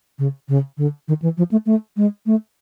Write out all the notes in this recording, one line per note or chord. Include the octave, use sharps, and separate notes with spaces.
C#3
C#3
D3
D#3
E3
F3
A3
A3
G#3
A3